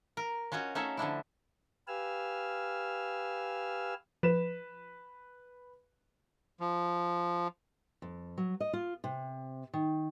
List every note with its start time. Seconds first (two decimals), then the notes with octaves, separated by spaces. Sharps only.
0.17 A#4
0.52 C#4 F4 F#4 C#5 D#5
0.75 A3 C#4 D#4 C#5 E5
0.97 D3 F3 D4 E4
1.88 G4 B4 F5 G#5 E6 F6
4.23 F3 B4 E7
6.60 F3
8.02 F2
8.38 F#3
8.60 D#5
8.73 F4
9.04 C3
9.73 D#3